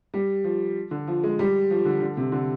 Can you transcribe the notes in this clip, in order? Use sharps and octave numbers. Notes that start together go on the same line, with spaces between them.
G3
F3
D3
F3
G#3
G3
F3
D3
D3
C3
D3